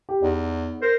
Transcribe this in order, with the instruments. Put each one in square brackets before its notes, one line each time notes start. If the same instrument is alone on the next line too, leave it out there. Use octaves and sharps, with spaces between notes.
[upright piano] G4
[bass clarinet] E2 [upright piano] D#4
[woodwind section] A#4 C5